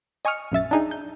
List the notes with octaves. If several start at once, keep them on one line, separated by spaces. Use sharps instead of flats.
D#5 G#5 C#6 D#6 F6 C#7
A#1 F#2 E5 A6
D4 D#4 G#4
G6